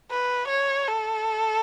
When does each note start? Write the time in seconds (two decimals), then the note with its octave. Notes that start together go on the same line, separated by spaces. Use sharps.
0.11 B4
0.48 C#5
0.88 A4